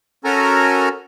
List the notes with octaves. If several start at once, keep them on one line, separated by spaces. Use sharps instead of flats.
C#4 F#4 A4 A#4 G#5 A#5